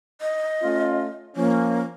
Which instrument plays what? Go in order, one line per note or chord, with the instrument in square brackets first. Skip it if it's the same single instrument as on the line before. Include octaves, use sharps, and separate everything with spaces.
[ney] D#5
[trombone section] A3 C#4 F4
[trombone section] F3 C#4 [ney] A#3